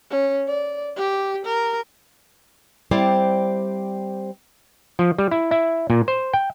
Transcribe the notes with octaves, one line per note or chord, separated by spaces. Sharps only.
C#4
D5
G4
A#4
G3 C4 E4 G4 C5 D5
F3
G3
E4
E4
A#2
C5
G5